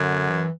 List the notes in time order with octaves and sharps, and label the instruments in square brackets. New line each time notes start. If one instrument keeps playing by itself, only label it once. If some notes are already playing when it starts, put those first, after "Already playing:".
Already playing: [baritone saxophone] F#2 [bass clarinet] D3
[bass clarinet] E3